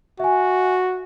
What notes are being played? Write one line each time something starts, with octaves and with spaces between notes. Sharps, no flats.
F#4 E5 G#5